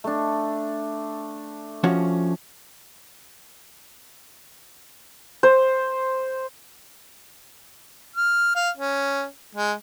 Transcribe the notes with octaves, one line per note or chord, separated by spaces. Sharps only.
A3 D4
F3 C#4 F#4
C5
F6
F5
C#4
G#3